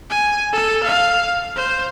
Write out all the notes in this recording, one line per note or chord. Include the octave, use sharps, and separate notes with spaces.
G#5
A4
F5
C5